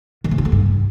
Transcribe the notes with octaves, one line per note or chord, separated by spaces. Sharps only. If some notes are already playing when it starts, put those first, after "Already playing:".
D#3
C#3
B3
D3
G2